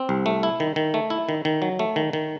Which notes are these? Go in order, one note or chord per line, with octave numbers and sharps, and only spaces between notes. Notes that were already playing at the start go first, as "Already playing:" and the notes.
Already playing: C4
C2
A3
E4
D#3
D#3
A3
E4
D#3
D#3
F#3
A3
D#3
D#3